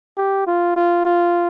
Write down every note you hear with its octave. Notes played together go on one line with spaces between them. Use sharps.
G4
F4
F4
F4